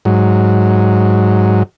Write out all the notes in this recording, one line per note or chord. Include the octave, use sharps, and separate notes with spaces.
G#2 F#3